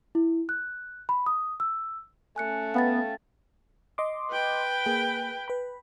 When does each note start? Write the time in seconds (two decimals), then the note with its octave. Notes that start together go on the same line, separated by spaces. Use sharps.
0.15 E4
0.49 F#6
1.09 B5
1.26 D#6
1.60 E6
2.36 A3 C#4 G#5 F#6 C#7
2.74 B3 F5 G5 A6
3.98 D#5 C6 D6
4.31 B4 G5
4.86 A#3 G#4
5.48 B4 B5